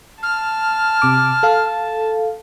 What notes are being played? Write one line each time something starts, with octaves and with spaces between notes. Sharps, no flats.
A5 F6
C3 D6
A4 F5